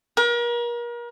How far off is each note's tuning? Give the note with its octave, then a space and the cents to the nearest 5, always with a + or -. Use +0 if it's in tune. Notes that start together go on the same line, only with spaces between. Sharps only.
A#4 +35